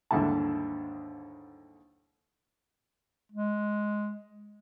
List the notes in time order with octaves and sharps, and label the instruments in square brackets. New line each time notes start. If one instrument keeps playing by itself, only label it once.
[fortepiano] D#2 G#2 D3 G3 E4 A5
[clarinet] G#3